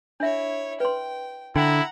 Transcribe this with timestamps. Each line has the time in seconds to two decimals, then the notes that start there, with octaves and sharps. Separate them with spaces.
0.20 D4 E4 C#5 E5
0.80 B4 G5 C6
1.56 D3 E4 F#5 G5 A#5